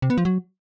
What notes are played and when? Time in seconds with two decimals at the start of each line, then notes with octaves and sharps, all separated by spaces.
0.02 C3
0.10 B3
0.18 F3
0.25 F#3